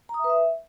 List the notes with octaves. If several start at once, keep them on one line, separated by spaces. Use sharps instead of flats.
A#5
D#6
E5
B4
E5